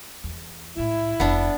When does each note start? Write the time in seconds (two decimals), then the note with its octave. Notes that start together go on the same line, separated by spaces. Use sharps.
0.24 E2
0.77 C2 A2 E4
1.20 F1 B3 D4